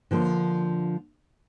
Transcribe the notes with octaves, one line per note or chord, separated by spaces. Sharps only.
D3 F3 A#3